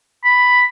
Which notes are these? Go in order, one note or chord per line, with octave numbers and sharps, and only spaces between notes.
B5